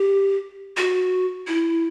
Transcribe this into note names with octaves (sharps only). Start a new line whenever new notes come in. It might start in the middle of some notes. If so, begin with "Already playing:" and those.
Already playing: G4
F#4
E4